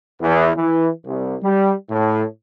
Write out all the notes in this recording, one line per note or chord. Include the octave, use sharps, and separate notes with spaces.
E2
E3
C2
G3
A2